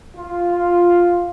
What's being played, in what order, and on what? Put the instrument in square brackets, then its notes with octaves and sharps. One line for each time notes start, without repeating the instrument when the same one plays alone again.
[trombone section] F4